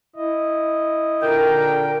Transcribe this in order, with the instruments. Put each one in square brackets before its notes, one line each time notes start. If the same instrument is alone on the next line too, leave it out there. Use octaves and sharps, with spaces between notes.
[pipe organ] E4 D#5
[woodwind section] A#2 D3 G5 [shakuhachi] A#4